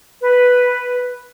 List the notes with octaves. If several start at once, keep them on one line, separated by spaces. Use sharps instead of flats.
B4